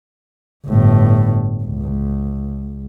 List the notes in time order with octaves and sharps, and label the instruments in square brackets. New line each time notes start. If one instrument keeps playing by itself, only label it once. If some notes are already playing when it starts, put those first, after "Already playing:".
[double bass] G1 A2
C#2